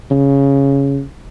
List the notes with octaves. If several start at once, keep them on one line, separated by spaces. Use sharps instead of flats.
C#3